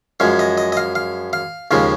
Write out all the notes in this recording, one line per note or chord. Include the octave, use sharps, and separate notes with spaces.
F#2 F3 G#3 F5
D#5
D#5
D#5
F5
F5
F5
D#2 C#3 F3 G#3 F5